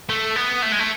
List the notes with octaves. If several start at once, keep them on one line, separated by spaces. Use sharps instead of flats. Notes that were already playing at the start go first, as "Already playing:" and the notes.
A3
B3
A3
G#3
A3